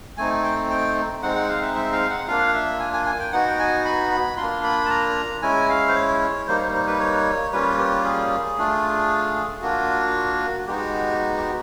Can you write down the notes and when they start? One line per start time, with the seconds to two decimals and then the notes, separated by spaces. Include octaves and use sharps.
0.17 A3 C4 D#4 G#5
0.44 G5
0.70 G5
1.22 G#3 C4 D#4 F#5
1.35 F#5
1.49 F5
1.62 E5
1.75 E5
1.92 F5
2.10 F#5
2.27 A#3 D4 F4 F5
2.54 E5
2.80 G#5
2.93 G#5
3.06 G#5
3.19 G5
3.32 B3 D#4 F#4 F#5
3.47 G5
3.59 G#5
3.85 B5
4.11 B5
4.37 A#3 D4 F4 C6
4.63 B5
4.85 A5
4.90 A#5
5.42 G#3 C#4 E4 G#5
5.69 F5
5.88 C5
5.95 C#5
6.47 G3 A#3 D#4 C5
6.61 C5
6.74 C5
6.87 B4
7.00 C#5
7.52 G3 A#3 C#4 F4 B4
7.78 G4
8.04 G#4
8.58 A3 D4 F4
9.62 A#3 D4 F4 F#4
10.67 G#3 B3 D#4 F#4 G4
11.37 G4